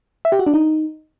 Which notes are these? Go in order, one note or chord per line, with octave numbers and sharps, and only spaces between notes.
E5
G4
F#4
D4
D#4